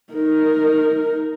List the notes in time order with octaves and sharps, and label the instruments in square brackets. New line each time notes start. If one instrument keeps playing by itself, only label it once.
[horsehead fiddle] D#4 A#4